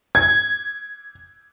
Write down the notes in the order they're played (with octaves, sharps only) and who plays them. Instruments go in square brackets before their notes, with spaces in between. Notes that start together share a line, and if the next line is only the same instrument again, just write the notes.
[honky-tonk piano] G#6